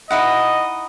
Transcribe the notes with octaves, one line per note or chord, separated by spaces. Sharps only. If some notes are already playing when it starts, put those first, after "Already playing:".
D#4 E4 D#5 F#5